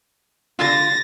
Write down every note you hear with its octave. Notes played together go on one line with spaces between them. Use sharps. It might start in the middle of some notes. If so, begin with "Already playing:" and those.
D3 F4 A6 A#6